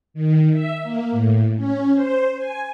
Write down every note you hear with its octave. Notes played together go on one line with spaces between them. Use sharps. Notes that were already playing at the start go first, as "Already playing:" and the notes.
D#3
E5
A#3
A2
C#4
C5
G#5